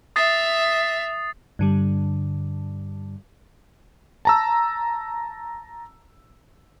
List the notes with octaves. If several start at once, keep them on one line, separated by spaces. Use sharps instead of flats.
E5 D#6 A6 C7
G2 D3 G3
A5 A#5 E6